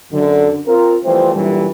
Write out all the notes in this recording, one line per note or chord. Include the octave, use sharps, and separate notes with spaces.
F#2 D3
C4 F4 A#4
E3 F3 G3 A3 C4
F#2 A#2 D3 E3 G3